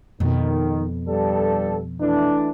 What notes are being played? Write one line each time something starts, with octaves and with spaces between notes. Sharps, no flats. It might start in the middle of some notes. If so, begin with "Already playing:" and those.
F2 B2 D#3
G2 G3 A4
E3 A3 D4